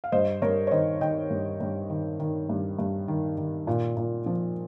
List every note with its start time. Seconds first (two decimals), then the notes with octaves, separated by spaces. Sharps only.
0.04 F5
0.12 G2 C5 D#5
0.42 G2 A#4 C#5
0.67 C#5
0.71 D#3 C5 D#5
1.01 D#3 D#5 G5
1.30 G2
1.60 G2
1.90 D#3
2.20 D#3
2.49 G2
2.79 G2
3.08 D#3
3.37 D#3
3.67 A#2
3.97 A#2
4.26 F3